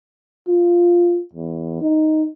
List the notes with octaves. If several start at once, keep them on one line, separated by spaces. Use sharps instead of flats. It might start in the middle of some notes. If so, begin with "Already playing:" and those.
F4
E2
D#4